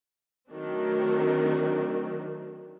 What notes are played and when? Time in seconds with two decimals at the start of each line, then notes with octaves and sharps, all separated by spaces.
0.48 D#3 F#3 A3 C4 D4